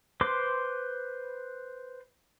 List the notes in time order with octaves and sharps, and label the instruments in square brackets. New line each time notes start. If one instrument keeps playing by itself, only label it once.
[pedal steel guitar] B4 C5 C6 D6